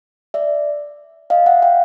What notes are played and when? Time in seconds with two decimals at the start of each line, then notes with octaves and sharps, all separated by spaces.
0.34 D5 E5
1.30 D#5 F5
1.46 E5 F#5
1.62 F5 G5